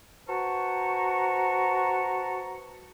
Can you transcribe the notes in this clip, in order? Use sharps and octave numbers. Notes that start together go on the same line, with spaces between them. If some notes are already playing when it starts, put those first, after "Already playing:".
F#4 B4 C5 A5 A#5 C#6